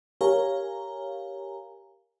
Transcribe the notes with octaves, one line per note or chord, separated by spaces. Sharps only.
G4 A#4 C#5 F5 G#5 A#5